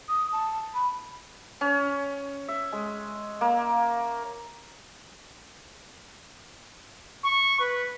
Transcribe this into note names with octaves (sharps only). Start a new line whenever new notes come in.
D#6
A5
B5
C#4
E5
G#3
A#3
C#6
B4